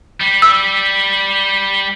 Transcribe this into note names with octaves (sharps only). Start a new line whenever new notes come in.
G3
E6